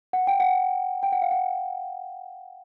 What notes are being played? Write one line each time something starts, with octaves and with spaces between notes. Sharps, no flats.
F#5
G5
F#5
G5
F#5
F5
F#5